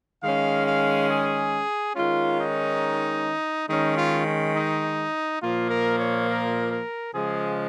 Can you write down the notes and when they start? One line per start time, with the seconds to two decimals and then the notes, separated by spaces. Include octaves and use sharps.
0.23 D#3 G#3 C#4 F5
0.67 F5
1.10 G#4
1.96 D#3 G#3 C#4 F4
2.40 D#4
3.69 D#3 G#3 C#4 D#4
3.98 F4
4.27 C#4
4.56 D#4
5.42 A#2 F3 A#3 F4
5.70 A#4
6.00 C#5
6.29 A#4
6.72 A#4
7.14 C#3 F3 G#3 G#4